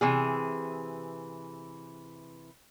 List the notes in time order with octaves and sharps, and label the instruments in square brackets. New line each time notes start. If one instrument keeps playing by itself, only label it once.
[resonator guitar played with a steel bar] C3 E3 G#4